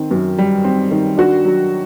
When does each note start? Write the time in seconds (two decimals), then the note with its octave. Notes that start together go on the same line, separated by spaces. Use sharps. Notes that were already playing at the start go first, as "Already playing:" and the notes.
Already playing: D#3 C4
0.11 F#2
0.38 G3
0.65 C4
0.91 D#3
1.17 D4 F#4
1.45 F#3